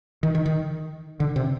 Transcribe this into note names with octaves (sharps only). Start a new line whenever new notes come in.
D#3
D#3
D#3
D3
C3